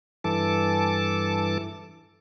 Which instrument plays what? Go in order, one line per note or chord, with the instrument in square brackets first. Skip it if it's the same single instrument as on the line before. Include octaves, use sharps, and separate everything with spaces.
[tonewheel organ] G2 E3 A4 A5 D6